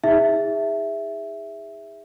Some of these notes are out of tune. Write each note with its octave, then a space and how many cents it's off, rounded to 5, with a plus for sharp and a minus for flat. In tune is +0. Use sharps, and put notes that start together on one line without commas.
D#4 +45 G#4 -30 E5 +0